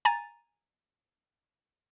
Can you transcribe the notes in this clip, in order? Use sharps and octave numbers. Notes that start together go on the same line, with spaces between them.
G#5 A#5 A6